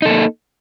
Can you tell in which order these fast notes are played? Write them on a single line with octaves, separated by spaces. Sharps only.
D#4 A4 A#3